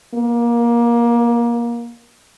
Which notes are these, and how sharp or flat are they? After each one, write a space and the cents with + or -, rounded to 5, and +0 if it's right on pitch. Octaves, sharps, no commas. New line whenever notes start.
A#3 +20